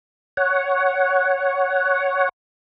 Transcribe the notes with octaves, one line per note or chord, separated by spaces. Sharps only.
C#5 F#5